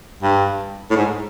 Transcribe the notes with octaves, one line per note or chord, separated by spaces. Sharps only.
G2
A2
G#2